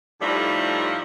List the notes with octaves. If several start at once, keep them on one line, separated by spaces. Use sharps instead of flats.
A2 F3 G3 A3 D#4